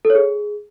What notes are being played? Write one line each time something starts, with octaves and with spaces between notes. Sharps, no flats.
A4
C#5
G#4